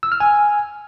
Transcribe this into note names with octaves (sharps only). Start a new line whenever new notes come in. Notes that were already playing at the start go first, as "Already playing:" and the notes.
E6
F6
G#5